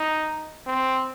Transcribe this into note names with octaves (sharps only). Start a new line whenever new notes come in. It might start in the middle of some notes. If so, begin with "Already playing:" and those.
Already playing: D#4
C4